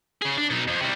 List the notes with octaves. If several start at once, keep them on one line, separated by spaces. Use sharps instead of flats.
C#3 G#4
D4
B2 D#4
F2 F3
C3 G3